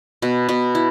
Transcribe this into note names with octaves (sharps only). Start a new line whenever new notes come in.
B2
B2
E4